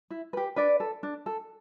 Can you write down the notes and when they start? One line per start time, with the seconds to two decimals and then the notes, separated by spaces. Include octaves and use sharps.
0.11 E4
0.33 G4 B4
0.56 D4 B4 D5
0.80 A4
1.03 D4
1.26 A4